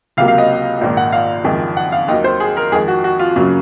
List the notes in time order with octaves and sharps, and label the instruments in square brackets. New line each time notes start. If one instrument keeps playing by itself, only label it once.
[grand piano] C#2 C3 F#3 A#3 F5
F5
D#5
A#1 G#2 D#3 A#3
F#5
F5
F#1 F2 D#3 G#3
F#5
F5
D#2 D#3 F#3 A#3 D#5
C5
G#4
A#4
F2 D#3 G#3 G#4
F#4
F#4
F4
F#2 C#3 F#3 A#3